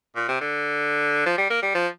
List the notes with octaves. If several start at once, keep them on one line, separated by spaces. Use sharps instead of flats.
A#2
C3
D3
F3
G3
A#3
G3
F3